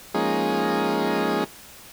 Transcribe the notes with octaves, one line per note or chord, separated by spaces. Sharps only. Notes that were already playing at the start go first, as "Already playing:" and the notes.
F3 G#3 A#3 C#4 D#4 G#4